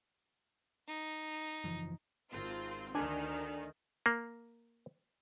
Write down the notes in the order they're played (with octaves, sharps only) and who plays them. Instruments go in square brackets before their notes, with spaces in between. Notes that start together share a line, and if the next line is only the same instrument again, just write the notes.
[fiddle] D#4
[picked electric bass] F#1 E3 F3
[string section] G#1 C4 F4
[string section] D2 D#3 [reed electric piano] D4 D5 G#5
[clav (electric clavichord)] A#3